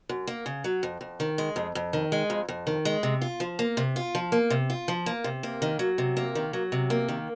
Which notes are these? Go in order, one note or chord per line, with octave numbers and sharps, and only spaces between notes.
F#2
A#3
C#3
F#3
F2
F2
D#3
G#3
F2
F2
D#3
G#3
F2
F2
D#3
G#3
C3
F4
F3
A#3
C3
F4
F3
A#3
C3
F4
F3
A#3
C3
A#3
D#3
F#3
C3
A#3
D#3
F#3
C3
A#3
D#3